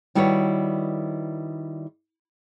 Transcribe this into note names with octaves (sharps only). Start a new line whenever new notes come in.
D#3 G3 E4 F#4 B4 C#5